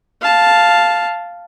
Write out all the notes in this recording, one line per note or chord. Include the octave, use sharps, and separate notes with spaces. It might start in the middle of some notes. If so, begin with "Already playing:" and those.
F5 A5